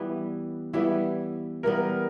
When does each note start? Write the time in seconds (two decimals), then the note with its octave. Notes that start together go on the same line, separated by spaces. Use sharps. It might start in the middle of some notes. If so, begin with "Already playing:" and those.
Already playing: E3 G3 B3
0.73 E3 G3 B3 E4
1.63 E3 G3 B3 A#4